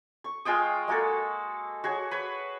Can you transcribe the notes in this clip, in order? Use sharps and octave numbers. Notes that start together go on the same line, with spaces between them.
C#6
G#3 F4 G5 D#6
G#3 A#3 F#4 A4
F#4 G#4 C#5
B4 C#5